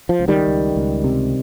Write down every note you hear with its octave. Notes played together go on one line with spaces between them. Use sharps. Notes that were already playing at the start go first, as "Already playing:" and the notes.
F3
C#2
D#3 G3
C#2
C#2
C3